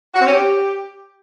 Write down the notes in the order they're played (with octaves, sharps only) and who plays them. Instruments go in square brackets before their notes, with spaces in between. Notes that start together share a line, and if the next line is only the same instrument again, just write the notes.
[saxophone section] F#4
C4
C#4
G4